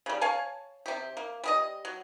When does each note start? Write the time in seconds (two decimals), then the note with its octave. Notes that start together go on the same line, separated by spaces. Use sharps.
0.06 C#3 G3
0.21 C#5 F5 G#5 A5
0.86 C3 G4
1.17 A#3
1.44 G3 G#4 D#5
1.85 F#3